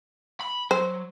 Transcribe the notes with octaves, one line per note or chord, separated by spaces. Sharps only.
B5
F#3 C5